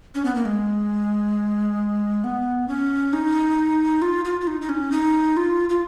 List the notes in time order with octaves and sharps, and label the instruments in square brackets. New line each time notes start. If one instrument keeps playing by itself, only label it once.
[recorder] C#4
B3
A#3
G#3
B3
C#4
D#4
F4
F4
F4
D#4
D#4
C#4
D#4
F4
F4